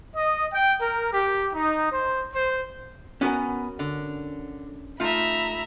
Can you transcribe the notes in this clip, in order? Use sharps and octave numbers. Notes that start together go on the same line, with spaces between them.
D#5
G5
A#4
G4
D#4
C5
C5
B3 C#4 F#4 A#4 G#5
D3
A3 D#4 F4 E5 A#5 B5